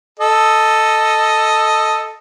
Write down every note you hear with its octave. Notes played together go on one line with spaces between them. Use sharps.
A4 D#5